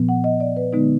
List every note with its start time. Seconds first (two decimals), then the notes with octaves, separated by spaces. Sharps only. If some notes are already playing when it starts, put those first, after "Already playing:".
Already playing: A#2 F3 B3
0.09 F#5
0.24 D#5
0.40 D5
0.57 B4
0.73 D3 G#3 B3 D#4